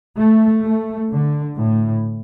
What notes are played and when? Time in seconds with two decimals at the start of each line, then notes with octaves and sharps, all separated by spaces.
0.18 A3
0.64 A3
1.12 D3
1.58 A2